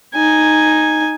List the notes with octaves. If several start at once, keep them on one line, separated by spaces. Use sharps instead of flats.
D#4 G#5